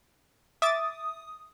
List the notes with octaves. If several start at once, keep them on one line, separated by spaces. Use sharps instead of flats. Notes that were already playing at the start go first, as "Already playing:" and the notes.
E5 D6 D#6 A6